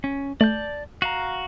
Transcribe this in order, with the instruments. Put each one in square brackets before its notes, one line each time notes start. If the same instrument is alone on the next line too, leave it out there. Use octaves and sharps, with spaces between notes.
[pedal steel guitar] C#4
[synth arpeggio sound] A3 [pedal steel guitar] D5 A5 G6
[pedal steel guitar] F#4 F5 A#5